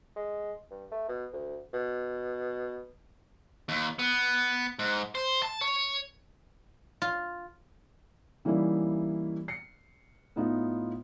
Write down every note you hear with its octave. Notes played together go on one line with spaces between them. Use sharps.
G#3
G2
A3
B2
D2
B2
D#2
B3
G#2
C5
A5
C#5
F4
E3 G3 A#3 C#4 D#4 E4
C7 C#7
A2 B3 D#4 F4